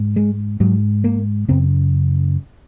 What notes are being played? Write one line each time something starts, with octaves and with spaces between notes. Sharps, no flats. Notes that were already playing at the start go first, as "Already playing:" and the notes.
Already playing: G#2
G#3
G#2 F#3
A#3
F#2 C#3 C4